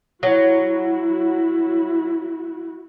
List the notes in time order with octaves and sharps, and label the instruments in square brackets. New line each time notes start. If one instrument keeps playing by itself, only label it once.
[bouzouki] F#3 [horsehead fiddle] E4 F#4